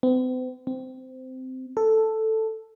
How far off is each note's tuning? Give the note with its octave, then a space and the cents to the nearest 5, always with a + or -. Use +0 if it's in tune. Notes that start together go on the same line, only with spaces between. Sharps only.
C4 -45
C4 -15
A4 +5